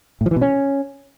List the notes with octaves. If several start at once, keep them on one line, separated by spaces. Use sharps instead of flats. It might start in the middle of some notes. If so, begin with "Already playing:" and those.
A2
F3
E3
B2
C#4